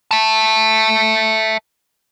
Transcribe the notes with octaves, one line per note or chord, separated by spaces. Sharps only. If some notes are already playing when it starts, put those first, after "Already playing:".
E5 A5